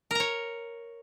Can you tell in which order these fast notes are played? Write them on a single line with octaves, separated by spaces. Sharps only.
A#4 A#5 C#5